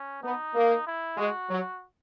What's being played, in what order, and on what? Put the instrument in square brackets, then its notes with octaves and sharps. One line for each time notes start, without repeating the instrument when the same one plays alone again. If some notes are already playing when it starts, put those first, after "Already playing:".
Already playing: [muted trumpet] C#4
[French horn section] B3 [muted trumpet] D#4
[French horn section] A#3
[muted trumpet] E4
[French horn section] G#3 [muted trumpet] F#4
[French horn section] F#3